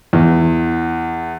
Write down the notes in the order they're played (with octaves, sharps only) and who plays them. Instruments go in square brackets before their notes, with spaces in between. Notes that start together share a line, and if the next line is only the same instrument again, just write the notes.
[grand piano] E2